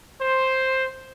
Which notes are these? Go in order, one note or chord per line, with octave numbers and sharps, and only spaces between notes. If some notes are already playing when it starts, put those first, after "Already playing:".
C5